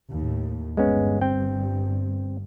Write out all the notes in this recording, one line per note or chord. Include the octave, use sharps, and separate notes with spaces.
D#2 A2
G1 G2 G#3 B3 C#4
C4 G5